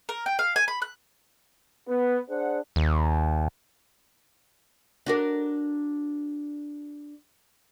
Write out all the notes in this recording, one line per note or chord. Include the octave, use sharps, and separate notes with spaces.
A#4
G5
F5
G#5
B5
F#6
B3
D4 G#4 C5 D5 F#5
D#2
D4 F#4 A#4